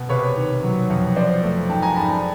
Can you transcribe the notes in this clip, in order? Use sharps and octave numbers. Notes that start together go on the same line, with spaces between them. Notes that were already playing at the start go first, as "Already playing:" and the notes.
Already playing: B2
C3 B4 C#5
D#3
F#3
F2
F3 C5 D5
A3
G#2 G5 A5
G#5 A#5
G#2 A5 B5
G5 A5